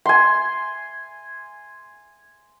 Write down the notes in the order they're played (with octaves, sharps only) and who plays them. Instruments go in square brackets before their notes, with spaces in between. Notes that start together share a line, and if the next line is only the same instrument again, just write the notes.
[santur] G#5 C6